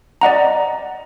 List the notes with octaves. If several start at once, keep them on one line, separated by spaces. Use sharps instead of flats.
D5 D#5 F#5 A#5